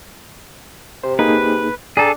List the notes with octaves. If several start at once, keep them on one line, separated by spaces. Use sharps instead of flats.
C3 C5
A#3 D#4 G#4 B4
D4 G#4 A4 G5 A#5 A6